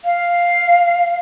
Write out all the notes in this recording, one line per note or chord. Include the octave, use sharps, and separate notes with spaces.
F5